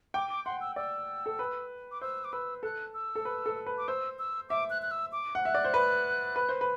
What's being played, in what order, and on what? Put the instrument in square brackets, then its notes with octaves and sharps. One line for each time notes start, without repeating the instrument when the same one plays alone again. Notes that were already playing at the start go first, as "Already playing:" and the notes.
[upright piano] G5 [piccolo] D6
[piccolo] D6
[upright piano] F#5 [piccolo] C6
[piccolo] E6
[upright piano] D5 [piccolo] E6
[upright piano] A4
B4
[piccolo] D6
[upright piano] C5 [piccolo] E6
[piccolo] D6
[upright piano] B4 [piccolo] E6
[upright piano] A4 [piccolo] F#6
[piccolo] E6
[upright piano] A4
B4
A4
B4
[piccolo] D6
[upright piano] C5 [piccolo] E6
[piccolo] E6
[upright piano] E5 [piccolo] D6
[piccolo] F#6
F#6
E6
D6
[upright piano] F#5
[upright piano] E5 [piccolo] F#6
[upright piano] D5
C5
B4
B4
C5
B4